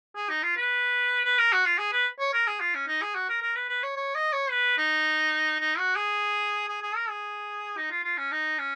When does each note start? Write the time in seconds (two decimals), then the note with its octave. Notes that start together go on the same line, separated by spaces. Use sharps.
0.16 G#4
0.29 D#4
0.43 F4
0.57 B4
1.25 B4
1.38 A#4
1.53 F#4
1.66 F4
1.79 G#4
1.93 B4
2.20 C#5
2.34 A#4
2.47 G#4
2.60 F4
2.75 C#4
2.88 D#4
3.02 G#4
3.15 F#4
3.29 A#4
3.42 A#4
3.55 B4
3.69 B4
3.83 C#5
3.97 C#5
4.15 D#5
4.33 C#5
4.50 B4
4.78 D#4
5.60 D#4
5.78 F#4
5.96 G#4
6.68 G#4
6.82 G#4
6.96 A#4
7.09 G#4
7.77 D#4
7.91 F4
8.04 F4
8.18 C#4
8.32 D#4
8.59 C#4